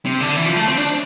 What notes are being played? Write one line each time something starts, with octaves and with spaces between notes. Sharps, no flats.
C3
D3
E3
F3
A3
C4
D4